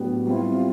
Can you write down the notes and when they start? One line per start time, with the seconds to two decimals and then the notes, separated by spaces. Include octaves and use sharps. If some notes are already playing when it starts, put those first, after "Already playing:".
Already playing: A2 F#3 B3 D4 G4
0.26 G3 C4 E4 F4